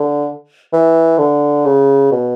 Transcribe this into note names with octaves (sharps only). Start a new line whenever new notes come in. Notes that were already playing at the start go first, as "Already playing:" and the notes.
Already playing: D3
E3
D3
C#3
B2